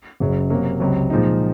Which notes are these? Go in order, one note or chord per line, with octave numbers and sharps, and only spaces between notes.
F#1 F#2 C#3 F#3
C3 F#3 A#3
C#2 C3 F#3
A#2 F3 G#3 D#4